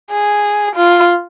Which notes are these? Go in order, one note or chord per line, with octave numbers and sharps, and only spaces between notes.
G#4
F4